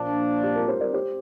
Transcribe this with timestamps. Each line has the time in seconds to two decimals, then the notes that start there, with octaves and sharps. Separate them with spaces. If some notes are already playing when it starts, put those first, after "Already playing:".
Already playing: A#2 F3 A#3 D4
0.43 G4
0.55 F4 A#4
0.68 G4 C5
0.81 A#4 D5
0.93 G4 C5